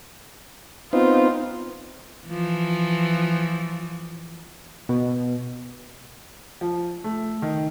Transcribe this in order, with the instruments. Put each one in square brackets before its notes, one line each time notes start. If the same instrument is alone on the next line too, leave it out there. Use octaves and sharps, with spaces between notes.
[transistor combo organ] B3 C4 D#4 [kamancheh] F4
[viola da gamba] E3 F3
[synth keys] B2
[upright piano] F3
A3
D#3